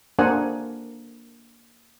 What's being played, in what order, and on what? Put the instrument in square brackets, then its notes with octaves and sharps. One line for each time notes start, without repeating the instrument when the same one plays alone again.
[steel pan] A#3 D4 A#4 C5 F#5 G#5